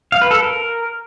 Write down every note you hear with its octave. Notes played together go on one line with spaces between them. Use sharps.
F5
B4
A4
A#4